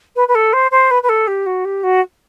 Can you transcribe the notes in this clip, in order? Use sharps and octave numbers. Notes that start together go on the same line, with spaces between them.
B4
B4
A4
C5
C5
B4
B4
A4
G4
F#4
G4
F#4